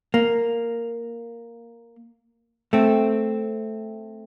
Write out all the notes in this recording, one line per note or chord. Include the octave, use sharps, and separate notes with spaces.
A#3
A3 C4